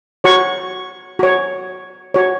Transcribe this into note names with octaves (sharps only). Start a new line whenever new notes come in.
F#4 C#5 C#6
F#4 C#5
F#4 C#5